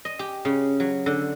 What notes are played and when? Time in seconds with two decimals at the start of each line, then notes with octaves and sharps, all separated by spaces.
0.05 D#5
0.19 G4
0.45 C#3
0.80 F#3
1.06 D3